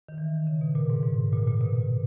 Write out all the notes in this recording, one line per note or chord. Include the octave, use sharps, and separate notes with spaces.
D#3
E3
C#3
B2
A#2
G#2
G#2
A#2
A#2
B2